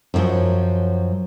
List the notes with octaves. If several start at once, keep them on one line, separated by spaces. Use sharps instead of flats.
F#2 A#2 D#3 F3 F#3